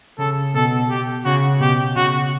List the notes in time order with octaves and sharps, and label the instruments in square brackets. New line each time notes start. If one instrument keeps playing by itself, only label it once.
[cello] C#3 [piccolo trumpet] A4
[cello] B2 [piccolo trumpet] A4
[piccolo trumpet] G4
[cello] C#3 [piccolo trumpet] F#4
[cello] B2 [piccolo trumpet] G4
[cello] C#3 [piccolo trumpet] F#4